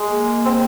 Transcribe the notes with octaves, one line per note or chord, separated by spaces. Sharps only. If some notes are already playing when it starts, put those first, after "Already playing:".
Already playing: G#3
A#3
C4